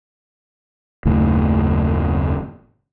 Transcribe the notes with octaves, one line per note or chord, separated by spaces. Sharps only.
F#1 D#2 A2